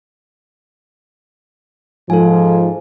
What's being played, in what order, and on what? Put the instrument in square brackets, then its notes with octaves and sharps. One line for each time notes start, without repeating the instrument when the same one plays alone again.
[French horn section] G#2 F3 [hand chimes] A4 G#5